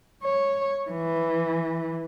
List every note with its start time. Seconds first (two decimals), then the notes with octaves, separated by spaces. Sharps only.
0.23 C#5
0.91 E3